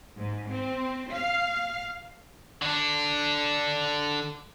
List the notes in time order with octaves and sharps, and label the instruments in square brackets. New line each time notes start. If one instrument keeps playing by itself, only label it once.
[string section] G#2
C4
F5
[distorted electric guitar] D3 D4